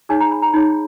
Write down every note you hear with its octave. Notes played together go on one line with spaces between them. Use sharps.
D#4 G#4 C#5 G#5
A#5
B5
A#5
D#4 G#4 C#5 B5